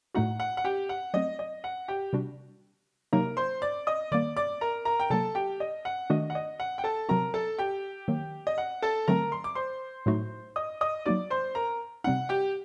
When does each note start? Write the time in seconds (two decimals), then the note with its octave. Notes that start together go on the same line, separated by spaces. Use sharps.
0.15 A2 A3 D#4 F#4 F#5
0.40 F#5
0.57 F#5
0.65 G4 G5
0.89 F#5
1.14 F#3 A3 C4 D#5
1.39 D#5
1.64 F#5
1.88 G4 G5
2.13 C3 G3 D4 F#4
3.13 C3 F#3 A#3 D#4 A#4 A#5
3.37 C5 C6
3.62 D5 D6
3.87 D#5 D#6
4.12 D#3 G3 A#3 D5 D6
4.36 D5 D6
4.61 A#4 A#5
4.85 A#4 A#5
5.00 G5
5.10 C3 F#3 A#3 A4 A5
5.35 G4 G5
5.60 D#5
5.85 F#5
6.10 D#3 A3 D4 F#4 D#5
6.30 F#5
6.35 D#5
6.60 F#5
6.78 G5
6.84 A4 A5
7.09 C3 F#3 C4 F#4 A#4 A#5
7.34 A4 A5
7.59 G4 G5
8.08 D#3 F#3 A#3
8.47 D#5
8.58 F#5
8.82 A4 A5
9.08 D3 F#3 A3 C4 A#4 A#5
9.32 C6
9.44 D6
9.55 C5 C6
10.06 A2 F#3 A3 D#4 F#4
10.56 D#5 D#6
10.81 D#5 D#6
11.06 F#3 A#3 D#4 F#4 D5 D6
11.30 C5 C6
11.55 A#4 A#5
12.04 C3 G3 C4 D#4 F#5
12.29 G4 G5